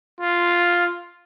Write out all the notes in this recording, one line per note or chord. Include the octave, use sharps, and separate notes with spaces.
F4